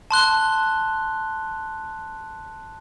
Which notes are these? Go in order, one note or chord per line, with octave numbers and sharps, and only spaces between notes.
A5 C6 F#6 G7